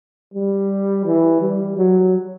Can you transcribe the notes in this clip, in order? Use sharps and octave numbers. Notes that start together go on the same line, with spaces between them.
G3
E3
G3
F#3